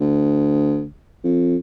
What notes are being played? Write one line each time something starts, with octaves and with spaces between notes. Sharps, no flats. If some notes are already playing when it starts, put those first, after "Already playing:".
D2
F2